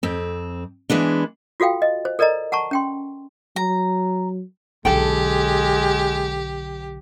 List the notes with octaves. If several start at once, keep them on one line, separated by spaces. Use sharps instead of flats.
F2 C4
E3 G#3 B3 D4
F4 F#4 A4 F5 G5
D#5
C5
A4 A#4 D5 D#5 A#5
F#5 A5 A#5 C#6
C#4 G5 C6
F#3 A#5
B1 D3 G#3 G4 A4 G5